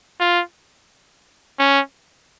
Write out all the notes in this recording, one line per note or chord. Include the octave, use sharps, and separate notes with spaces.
F4
C#4